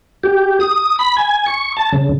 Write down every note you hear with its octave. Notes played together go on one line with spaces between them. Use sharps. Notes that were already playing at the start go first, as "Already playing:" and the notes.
G4
D#6
B5
G#5
C#6
A5
C#3